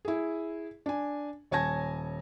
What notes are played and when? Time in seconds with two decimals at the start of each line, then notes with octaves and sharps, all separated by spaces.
0.05 E4 G#4
0.86 D4 G#5
1.51 D#1 C#5 G#5 A5 G#6 A#6